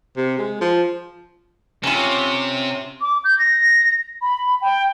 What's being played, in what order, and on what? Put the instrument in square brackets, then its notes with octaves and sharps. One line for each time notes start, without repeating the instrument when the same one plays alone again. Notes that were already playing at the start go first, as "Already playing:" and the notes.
[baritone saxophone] C3
G#3
F3
[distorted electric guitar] C3 [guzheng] C#4 F4
[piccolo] D6
G6
A#6
B5
G5